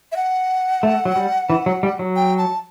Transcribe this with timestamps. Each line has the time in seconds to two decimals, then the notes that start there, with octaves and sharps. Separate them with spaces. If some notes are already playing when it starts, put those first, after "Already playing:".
0.12 E5
0.16 F#5
0.83 A3
1.05 F#3
1.16 G3
1.50 E3
1.66 F#3
1.83 G3
1.99 F#3
2.16 G5
2.38 A5